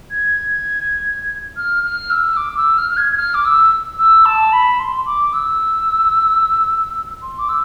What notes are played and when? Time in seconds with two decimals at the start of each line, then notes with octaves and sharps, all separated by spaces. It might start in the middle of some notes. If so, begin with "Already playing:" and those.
0.10 G#6
1.56 F6
1.83 F6
2.10 E6
2.36 D6
2.56 E6
2.77 F6
2.90 F6
2.97 G#6
3.11 G#6
3.17 F6
3.34 D6
3.45 E6
3.98 E6
4.25 A5
4.52 B5
4.79 C6
5.05 D6
5.33 E6
7.22 C6
7.38 D6
7.48 E6